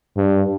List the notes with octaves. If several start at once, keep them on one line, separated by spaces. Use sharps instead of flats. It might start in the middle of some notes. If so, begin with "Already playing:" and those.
G2